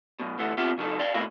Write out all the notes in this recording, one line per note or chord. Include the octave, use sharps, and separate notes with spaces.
F#2 B2
D2 E3 A3 F#5
B3 C4 F4 G4 E5 F#5
C#3 F#3 D#4 A4
D5 F5 G5
B2 A3 A#3 C4 E4 F#4